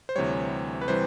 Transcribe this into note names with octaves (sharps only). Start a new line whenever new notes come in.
C5
D2 C3 E3 G3 C#5
B4
C3 E3 G3 C5